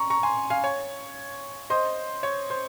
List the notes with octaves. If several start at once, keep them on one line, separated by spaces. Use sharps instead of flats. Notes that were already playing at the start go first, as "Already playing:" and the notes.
Already playing: A#5 C#6
A#5 C#6
G#5 C6
F5 G#5
C#5
C5 D#5
C#5
C5